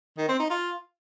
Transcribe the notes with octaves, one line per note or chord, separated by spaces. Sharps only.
D#3
C4
D#4
F4